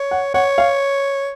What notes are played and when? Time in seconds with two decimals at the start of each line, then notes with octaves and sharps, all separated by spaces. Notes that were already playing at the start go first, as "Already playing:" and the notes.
Already playing: C#5
0.11 F#5
0.34 C#5 F#5
0.58 F5